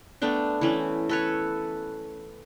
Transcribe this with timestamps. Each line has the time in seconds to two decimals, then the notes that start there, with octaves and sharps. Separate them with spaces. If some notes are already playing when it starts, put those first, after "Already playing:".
0.22 A3 B3 D4 G5
0.61 E3 A3 C#4
1.09 A4 B4 C#5